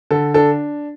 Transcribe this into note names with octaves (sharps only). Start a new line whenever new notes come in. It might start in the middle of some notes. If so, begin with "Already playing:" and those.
D3 A4
D4 A4